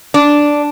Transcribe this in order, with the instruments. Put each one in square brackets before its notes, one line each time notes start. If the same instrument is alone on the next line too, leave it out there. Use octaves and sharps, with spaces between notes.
[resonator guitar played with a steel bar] D4